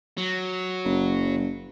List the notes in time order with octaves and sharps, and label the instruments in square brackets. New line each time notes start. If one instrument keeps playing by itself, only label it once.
[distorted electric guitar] F#3
[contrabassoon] F#1